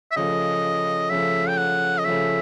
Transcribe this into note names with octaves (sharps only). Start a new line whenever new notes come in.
E5
C#3 F3 A3 D#5
C#3 F3 A3 E5
G5
F#5
D#5
C#3 F3 A3 E5